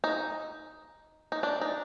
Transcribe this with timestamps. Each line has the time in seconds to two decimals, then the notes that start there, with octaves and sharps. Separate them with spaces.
0.04 D#4
1.32 D#4
1.43 D4
1.61 D#4